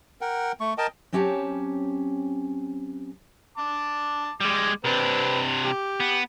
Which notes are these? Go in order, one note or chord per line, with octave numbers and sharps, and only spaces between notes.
A#4 F#5 G5
A3 C#6
A#4 D#5 G5 A5
F#3 C4 C#4 G4 E5 A5
A5 D6
G3 G#3 D6
C3 C4 D4 B4
G4
B3